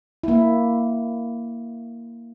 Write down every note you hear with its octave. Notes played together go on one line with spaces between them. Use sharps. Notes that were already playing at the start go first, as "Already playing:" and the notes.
A#3 E4